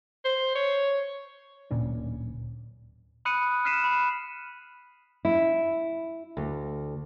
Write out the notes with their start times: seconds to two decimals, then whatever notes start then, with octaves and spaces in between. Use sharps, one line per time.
0.25 C5
0.55 C#5
1.71 D1 A#2 C#4 D4
3.25 B5 D#6 F#6 C#7 D#7
3.65 F6 F#6 B6 C7 D#7 E7
3.84 B5
5.25 E4
6.37 D2